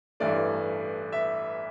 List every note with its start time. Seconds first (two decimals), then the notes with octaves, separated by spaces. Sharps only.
0.20 A1 G2 E3 A3 D5
1.12 E5